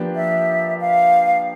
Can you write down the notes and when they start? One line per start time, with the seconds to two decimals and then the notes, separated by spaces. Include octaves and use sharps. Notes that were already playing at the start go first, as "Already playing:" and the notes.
Already playing: F3 A#3 D4 G4 B4
0.15 E5
0.80 F5